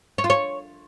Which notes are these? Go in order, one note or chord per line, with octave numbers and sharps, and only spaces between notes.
C#5
F4
C#5